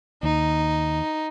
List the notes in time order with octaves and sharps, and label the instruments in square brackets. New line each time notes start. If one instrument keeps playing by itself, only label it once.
[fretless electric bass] D#2 [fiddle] D#4